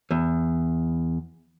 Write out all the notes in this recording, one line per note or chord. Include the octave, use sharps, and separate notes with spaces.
E2